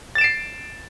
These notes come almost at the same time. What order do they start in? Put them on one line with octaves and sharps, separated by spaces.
A6 E7 D7 C7